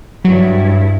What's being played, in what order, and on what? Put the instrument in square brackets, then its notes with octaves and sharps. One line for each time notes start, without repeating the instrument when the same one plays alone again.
[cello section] G2 E4 [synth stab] F#3